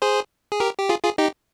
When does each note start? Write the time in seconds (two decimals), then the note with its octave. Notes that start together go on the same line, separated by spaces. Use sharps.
0.02 G#4 C5
0.52 G#4
0.60 G4 A#4
0.79 G4
0.89 F4 G#4
1.03 F4 G#4
1.18 D#4 G4